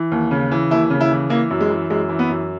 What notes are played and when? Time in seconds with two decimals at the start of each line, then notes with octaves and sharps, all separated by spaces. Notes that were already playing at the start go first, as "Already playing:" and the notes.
Already playing: E3
0.12 D#2
0.31 C#3
0.51 E3
0.71 D#2 E4
0.90 C#3
1.01 E4
1.11 E3
1.30 E3 A#3
1.50 F#2
1.60 G#3
1.70 E3
1.90 F#2 G#3
2.09 E3
2.19 B3
2.29 F#2